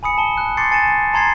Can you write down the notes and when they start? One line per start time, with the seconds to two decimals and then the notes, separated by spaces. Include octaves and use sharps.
0.03 G#5 B5 D#6 C#7
0.18 A5 G7
0.38 F#6
0.57 C6 D6 G6 A6 C7 C#7
0.71 G#5 A6 C#7 D#7 E7
1.13 A5 A#5 C6 G#6 A6 C7